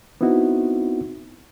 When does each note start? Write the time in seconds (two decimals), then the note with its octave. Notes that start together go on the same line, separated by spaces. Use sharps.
0.21 B3 C4 D#4 E4 F#4